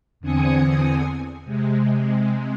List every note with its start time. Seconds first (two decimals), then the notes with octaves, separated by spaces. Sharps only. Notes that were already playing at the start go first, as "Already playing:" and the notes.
0.20 E2 D3 C4 G#5 D#6 C#7
1.44 C3 G#3